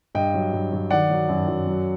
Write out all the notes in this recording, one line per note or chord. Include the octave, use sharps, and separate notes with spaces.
G2 D#5 G5
F#3
G2
F#3
D#3 D5 F#5
F#3
F#2
F#2
F#3